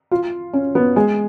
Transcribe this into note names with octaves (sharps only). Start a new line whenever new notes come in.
F4
C#4
B3
G#3